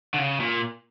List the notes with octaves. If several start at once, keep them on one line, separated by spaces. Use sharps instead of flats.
D3
C#3
A#2